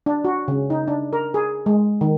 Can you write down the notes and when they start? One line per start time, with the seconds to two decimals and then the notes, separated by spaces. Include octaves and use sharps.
0.06 D4
0.25 F#4
0.48 C#3
0.70 D#4
0.88 D4
1.13 A#4
1.34 G#4
1.66 G#3
2.01 D#3